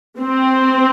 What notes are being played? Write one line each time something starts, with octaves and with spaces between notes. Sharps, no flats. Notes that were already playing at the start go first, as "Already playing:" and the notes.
C4